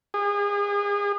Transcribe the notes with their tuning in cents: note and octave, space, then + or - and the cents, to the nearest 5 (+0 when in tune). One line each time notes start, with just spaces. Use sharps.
G#4 -35